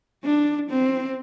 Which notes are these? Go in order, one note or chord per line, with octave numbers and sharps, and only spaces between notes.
D4
C4